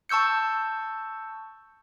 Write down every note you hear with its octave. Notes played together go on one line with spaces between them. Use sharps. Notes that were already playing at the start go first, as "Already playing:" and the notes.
A5 C#6 E6 G6 C#7